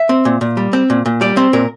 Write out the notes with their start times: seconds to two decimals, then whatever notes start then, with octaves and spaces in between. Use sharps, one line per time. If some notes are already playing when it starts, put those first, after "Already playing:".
Already playing: E5
0.09 C4
0.25 A#2
0.41 A#2
0.57 G3
0.73 C4
0.90 A#2
1.06 A#2
1.21 G3 D5
1.37 C4 C5
1.53 A#2 A#4